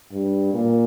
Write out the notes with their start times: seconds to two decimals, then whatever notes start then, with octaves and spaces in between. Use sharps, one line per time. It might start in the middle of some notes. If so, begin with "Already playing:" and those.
0.12 G2
0.54 A#2